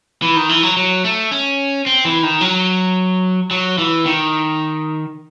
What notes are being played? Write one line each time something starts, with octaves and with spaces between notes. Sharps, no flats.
E3
D#3
E3
F#3
F#3
A3
C#4
C4
E3
D#3
F#3
F#3
E3
D#3